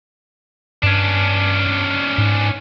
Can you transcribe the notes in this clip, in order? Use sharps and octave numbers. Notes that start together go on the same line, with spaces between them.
G2 C#4 D4
G#2